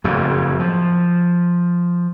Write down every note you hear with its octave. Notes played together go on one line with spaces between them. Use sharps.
F#1 F2 A2 C#3
F3